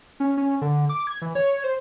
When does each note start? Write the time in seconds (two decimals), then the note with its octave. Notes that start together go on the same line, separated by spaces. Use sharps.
0.20 C#4
0.37 C#4
0.61 D3
0.89 D6
1.07 G#6
1.22 E3
1.35 C#5
1.64 C5